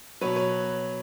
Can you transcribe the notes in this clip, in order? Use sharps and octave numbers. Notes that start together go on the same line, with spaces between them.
B2 F#3 B4 C#5
B4 C#5